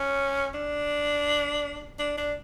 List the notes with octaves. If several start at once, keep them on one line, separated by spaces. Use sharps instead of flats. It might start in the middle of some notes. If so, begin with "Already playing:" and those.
Already playing: C#4
D4
D4
D4